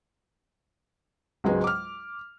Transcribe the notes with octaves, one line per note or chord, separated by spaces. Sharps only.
C#2 G#2 F#3 G#3 B3
D6 F6